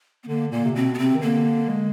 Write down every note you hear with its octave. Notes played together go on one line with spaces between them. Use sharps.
B3
D3 A#3
A#2 A#3
C3
B2 C4
B3
C3 C4
D#3
D3 A#3
G#3